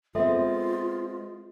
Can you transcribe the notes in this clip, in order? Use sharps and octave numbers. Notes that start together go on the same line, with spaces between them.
G#3 B3 C4 F4 A4 E5